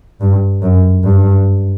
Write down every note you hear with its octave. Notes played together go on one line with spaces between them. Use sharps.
G2
F#2
G2